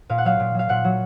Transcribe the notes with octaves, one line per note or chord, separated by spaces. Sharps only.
A#2 F5
F#5
F#3 F5
A#2
F#3 F5
A#2 F#5
F#3